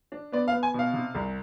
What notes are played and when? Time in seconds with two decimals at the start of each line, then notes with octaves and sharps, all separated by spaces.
0.12 D4
0.32 B3 D5
0.48 F5
0.53 B3
0.63 G#5
0.74 B2 F5
0.94 C3
1.15 C2